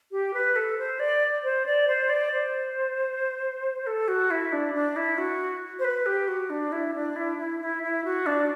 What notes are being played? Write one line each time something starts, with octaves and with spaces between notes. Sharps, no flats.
G4
B4
A4
C5
D5
C5
D5
C5
D5
C5
A4
F#4
E4
D4
D4
E4
F#4
C5
B4
G4
F#4
D4
E4
D4
E4
E4
E4
E4
F#4
D4